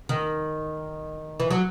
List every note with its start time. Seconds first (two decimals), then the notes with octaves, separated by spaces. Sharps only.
0.09 D#3
1.40 E3
1.50 F#3